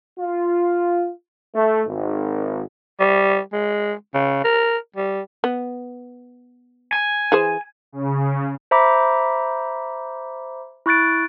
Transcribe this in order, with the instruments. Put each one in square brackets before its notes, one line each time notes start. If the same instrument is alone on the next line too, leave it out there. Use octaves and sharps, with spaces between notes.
[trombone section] F4
A3
G#1
[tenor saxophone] G3
G#3
C#3
A#4
G3
[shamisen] B3
[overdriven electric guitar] G#5
[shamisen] E3 G#4 C5
[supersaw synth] C#3
[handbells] C5 E5 A#5 B5 D6
E4 C#6 F#6 A6 D7